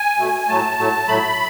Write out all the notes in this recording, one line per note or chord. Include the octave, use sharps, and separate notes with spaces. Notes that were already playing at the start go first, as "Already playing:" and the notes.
Already playing: G#5
B2 A3
A2 F#3 A3 A5
A2 F#3 A3
A2 F#3 A3 B5